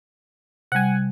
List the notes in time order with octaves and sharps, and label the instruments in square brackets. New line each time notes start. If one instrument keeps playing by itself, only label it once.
[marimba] C3 G3 [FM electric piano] F#5 G#5